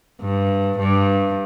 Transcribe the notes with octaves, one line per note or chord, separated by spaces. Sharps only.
G2
G2